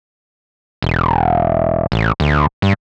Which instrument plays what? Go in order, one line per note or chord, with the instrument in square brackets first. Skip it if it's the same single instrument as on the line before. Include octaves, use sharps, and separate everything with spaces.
[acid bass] E1
A1
D2
G2